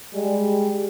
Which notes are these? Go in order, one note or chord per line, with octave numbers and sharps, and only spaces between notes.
G3 G#3